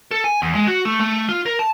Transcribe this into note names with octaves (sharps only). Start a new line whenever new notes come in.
A4
G#5
E2
G#3
F#4
A3
A3
F4
A#4
A5